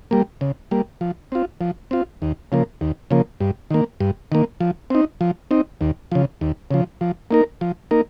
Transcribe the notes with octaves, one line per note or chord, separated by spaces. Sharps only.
G3 A#3
C#3
G3 A#3
F3
C4 F4
F3
C4 F4
D#2
C#3 F3 A#3
D#2
C#3 F3 A#3
G2
D#3 A#3
G2
D#3 A#3
F3
C4 D#4
F3
C4 D#4
D#2
C#3 F3
D#2
C#3 F3
F3
A#3 D#4 A#4
F3
A#3 D#4 A#4